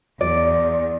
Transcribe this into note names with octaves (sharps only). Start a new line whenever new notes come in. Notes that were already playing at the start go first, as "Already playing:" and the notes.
E2 D5